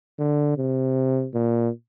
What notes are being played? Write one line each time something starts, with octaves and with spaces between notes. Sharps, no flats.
D3
C3
A#2